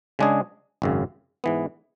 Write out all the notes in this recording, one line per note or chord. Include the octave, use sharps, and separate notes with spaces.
C#3 G#3 D4 G#4
G#1 F#2 C#3
G#2 E3 B3